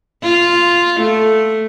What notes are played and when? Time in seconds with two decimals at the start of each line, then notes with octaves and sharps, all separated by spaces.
0.24 F4
1.01 A3